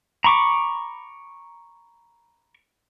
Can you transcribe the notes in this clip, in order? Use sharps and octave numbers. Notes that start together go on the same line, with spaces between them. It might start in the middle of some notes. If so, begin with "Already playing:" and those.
A#5 B5 C#6 D6